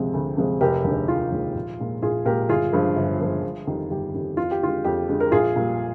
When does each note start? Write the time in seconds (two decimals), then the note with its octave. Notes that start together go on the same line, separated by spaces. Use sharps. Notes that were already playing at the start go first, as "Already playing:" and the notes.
Already playing: D2 C3 F3 G#3
0.14 D2
0.37 C3 F3 G#3
0.61 F1 G4 A#4
0.84 D#2 D3 G#3
1.08 F1 F4 G#4
1.32 D#2 D3 G#3
1.55 A#1
1.79 A#2 G#3
2.02 A#1 F4 G#4
2.25 A#2 G#3 G4 A#4
2.49 G1 F4 G#4
2.72 G2 F3 G#3
2.96 G1
3.20 G2 F3 G#3
3.43 G1
3.67 F2 D#3 G3
3.91 G1 G4
4.14 F2 D#3 G3
4.37 F2 F4
4.51 G4
4.62 D3 G#3 F4
4.84 F2 G4
5.09 D3 G#3
5.20 A#4
5.32 A#1 F4 G#4
5.56 A#2 G3